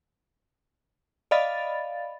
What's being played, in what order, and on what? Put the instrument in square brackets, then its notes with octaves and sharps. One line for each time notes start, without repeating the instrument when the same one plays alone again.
[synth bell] D5 D#5 F5 B5 A6